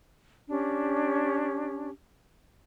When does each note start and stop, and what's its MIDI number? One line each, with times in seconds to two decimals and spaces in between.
0.48 1.90 61
0.48 1.90 62
0.48 1.90 67